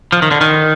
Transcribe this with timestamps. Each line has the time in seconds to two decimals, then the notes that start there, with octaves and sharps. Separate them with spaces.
0.12 F3
0.22 D#3
0.31 D3
0.41 D#3